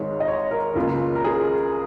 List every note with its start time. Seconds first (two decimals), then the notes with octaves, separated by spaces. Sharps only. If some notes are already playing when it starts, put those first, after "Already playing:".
Already playing: G#1 G#2 G#3 C#5
0.20 D#5
0.28 C#5
0.51 A#4
0.75 C#2 C#3 A#3 F4
1.15 A#4
1.24 G#4